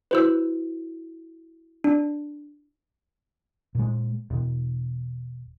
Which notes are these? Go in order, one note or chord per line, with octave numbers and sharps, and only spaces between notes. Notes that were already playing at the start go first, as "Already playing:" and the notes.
E4 F#4 B4 C5 E6
D4
A#2 G#3
E1